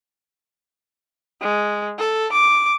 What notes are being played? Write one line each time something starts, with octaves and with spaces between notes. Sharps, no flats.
G#3
A4
D6